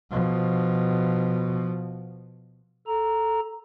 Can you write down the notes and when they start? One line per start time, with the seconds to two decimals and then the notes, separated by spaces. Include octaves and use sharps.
0.11 B2 F3
2.87 A4 A#5